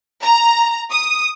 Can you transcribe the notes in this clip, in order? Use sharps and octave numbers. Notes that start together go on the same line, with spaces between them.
A#5
D#6